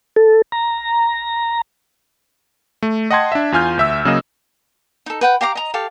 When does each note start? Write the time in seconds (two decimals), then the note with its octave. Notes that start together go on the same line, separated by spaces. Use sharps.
0.16 A4
0.52 A#5
2.82 A3
3.11 D#5 F#5 G5 A5 C6 G#6
3.32 D4 E5
3.52 E2 F4 G#5 F6 G6
3.77 D2 E5 E6
4.05 C#3 F#3 A#3 G#4 D#5 E7
5.06 D#4 A4
5.21 B4 F#5 G5
5.41 G4 F5 A#5 D6
5.55 D#5 A#5
5.74 G4 A4 F5